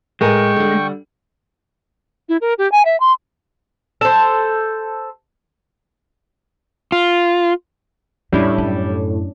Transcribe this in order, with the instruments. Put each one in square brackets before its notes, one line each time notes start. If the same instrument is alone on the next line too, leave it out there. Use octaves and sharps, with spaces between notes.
[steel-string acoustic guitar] A2 A#4 G#5 [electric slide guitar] G#3 [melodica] G5 C#6
[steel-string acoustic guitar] D3 G3
[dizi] E4
A#4
G4
G#5
E5
C6
[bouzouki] A4 C5
[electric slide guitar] F4
[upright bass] E2 [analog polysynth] A2 [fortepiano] G3 E4 [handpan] C#4 D4
[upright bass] F#2